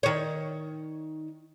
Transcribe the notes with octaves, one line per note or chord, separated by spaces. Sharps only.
D#3 C#5